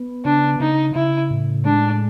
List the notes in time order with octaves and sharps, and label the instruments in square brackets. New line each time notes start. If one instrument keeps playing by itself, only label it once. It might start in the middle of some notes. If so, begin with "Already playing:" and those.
Already playing: [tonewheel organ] B3
[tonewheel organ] C#3 [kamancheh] D4
[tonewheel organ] C#3 [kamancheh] D#4
[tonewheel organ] C#3 [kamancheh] E4
[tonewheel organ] A2
[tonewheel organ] G#3 [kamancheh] D4